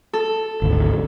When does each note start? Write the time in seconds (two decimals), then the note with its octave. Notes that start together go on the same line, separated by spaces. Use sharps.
0.13 A4
0.62 G#1 D2